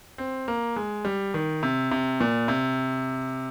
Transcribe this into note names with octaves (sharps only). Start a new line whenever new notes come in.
C4
A#3
G#3
G3
D#3
C3
C3
A#2
C3